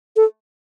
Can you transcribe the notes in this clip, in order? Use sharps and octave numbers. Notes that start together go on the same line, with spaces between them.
A4